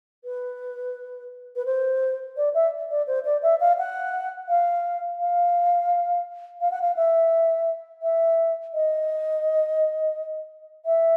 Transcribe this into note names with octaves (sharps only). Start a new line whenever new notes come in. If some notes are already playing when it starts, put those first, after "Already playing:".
B4
B4
C5
D5
E5
D5
C5
D5
E5
F5
F#5
F5
F5
F5
F#5
F5
E5
E5
D#5
E5